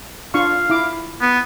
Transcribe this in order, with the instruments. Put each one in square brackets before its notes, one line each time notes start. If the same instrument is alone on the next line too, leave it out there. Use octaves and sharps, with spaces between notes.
[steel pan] D4 F4 C#6 [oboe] F5
[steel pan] E4 D6
[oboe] B3